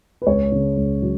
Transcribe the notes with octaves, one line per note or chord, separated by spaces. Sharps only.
B4
C#2 C#5
C#3
C#2
F#3